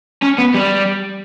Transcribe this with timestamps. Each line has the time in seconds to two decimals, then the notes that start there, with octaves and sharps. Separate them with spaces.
0.23 C#4
0.38 B3
0.54 G3